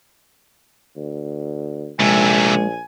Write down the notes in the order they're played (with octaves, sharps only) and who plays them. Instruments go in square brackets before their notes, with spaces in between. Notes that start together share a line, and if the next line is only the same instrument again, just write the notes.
[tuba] D2
[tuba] A#1 [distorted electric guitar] C3 A3 [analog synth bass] G#3 [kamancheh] G#5